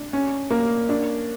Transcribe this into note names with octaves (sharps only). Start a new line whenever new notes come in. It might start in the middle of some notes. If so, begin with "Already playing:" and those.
Already playing: D4
C#4
A#3
D4